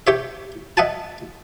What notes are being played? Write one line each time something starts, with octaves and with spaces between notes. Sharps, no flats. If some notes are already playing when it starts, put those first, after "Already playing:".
G4 C#5 E5
D#5 E5 F#5 G#5 A5